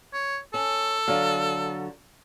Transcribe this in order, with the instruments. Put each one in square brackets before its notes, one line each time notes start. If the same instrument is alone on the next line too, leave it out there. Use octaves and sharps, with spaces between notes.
[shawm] C#5
[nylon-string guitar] C#4 [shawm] A4
[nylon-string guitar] D3 F#3 F5